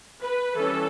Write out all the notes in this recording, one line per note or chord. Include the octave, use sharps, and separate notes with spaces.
B4
E3 G3 C#4 A4